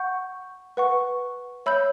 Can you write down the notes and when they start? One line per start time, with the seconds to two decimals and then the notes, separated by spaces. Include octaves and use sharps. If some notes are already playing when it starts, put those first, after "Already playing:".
Already playing: F#5 C#6 G6
0.77 B4 F#5 C#6
1.66 C#5 E5 B5 E6 G6